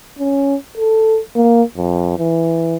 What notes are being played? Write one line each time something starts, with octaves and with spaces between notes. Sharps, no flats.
C#4
A4
A#3
F2
E3